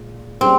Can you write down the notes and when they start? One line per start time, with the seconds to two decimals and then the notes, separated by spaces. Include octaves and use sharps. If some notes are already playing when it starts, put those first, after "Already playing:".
Already playing: A#2 G#3
0.41 G3 A#3 C4 C#4 G#4